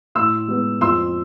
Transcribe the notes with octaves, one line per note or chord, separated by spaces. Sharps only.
A2 C6 E6
G#3 B3
F2 C6 E6